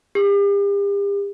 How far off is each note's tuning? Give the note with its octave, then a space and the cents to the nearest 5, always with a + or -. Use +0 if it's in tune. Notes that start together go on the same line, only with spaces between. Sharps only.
G4 +40